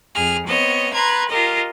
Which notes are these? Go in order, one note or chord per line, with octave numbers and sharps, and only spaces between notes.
F2 G#4 F6
B3 C4 C#5 D#5
B4 A#5 C6 G#6
F4 G4 A#4 D#5